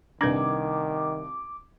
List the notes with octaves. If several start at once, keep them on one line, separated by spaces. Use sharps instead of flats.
C2 D#3 D4 B4 D6 G#6 F#7